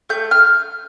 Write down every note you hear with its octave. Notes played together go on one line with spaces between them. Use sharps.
A3 G6
F6